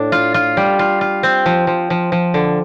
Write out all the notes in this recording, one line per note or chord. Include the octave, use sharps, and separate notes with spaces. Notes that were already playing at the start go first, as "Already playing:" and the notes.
Already playing: A2 D4
F4
F4
G3
F4
F4
C4
F3
F3
F3
F3
D3